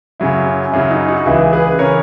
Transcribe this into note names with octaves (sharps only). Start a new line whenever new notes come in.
F#2 C#3 F#3 E4
F#2 C#3 F#3 E4
D#4
D#4 F#4
C#2 C#3 E3 E4 G#4
G#4 B4
B4
C#3 E3 A#4 C#5